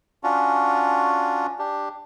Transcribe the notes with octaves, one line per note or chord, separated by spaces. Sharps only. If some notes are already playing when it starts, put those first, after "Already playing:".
C#4 D4 F4 F#4
D4 G4